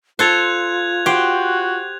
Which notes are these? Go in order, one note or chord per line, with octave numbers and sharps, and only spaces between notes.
F4 A4 C5 F#6 G#6 F7
F#4 G4 C5